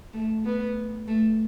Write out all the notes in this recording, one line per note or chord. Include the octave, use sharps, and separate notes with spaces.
A3
B3
A3